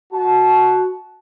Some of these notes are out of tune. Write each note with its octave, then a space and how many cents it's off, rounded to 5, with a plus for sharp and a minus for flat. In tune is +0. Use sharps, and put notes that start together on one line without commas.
F#4 +0 A5 -25